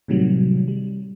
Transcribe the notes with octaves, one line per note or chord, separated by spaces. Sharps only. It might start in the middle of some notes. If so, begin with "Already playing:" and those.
A2 C3 D#3 F#3 G3
G3